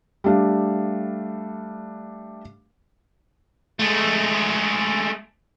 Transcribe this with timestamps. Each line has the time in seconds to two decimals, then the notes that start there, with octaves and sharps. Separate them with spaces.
0.24 G3 A3 D4 F5
3.79 G#3 A3